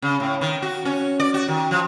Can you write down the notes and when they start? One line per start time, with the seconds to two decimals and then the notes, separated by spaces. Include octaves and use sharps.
0.02 C#3
0.20 A2
0.41 D#3
0.62 F#4
0.85 C#4
1.20 D5
1.34 F#4
1.48 D#3
1.71 F3